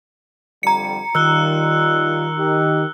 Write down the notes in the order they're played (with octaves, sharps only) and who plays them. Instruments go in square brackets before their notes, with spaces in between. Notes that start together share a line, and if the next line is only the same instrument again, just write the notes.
[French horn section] F2 D3 G3 [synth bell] A#5 C#7
[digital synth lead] D#3 [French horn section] G3 D#4 F4 [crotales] E6 F#6 G7
[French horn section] D#4 G4